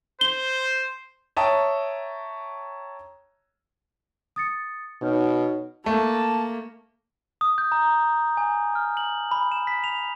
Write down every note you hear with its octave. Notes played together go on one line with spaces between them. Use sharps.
C5 G7
C#5 E5 G5 A5 A#5 D#6
D#6 A6 C#7
B2 D#4 C#5 F6
A3 A#3 A5
D#6
G6
A#5
G#5
F6
F#7
B5
E7
B6
F7